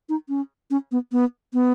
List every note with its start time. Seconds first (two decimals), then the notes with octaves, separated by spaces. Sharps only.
0.09 D#4
0.29 C#4
0.71 C#4
0.92 B3
1.12 B3
1.53 B3